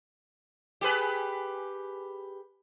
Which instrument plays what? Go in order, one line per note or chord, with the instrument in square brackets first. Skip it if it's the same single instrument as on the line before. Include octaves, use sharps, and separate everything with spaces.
[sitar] G4 G#4 B4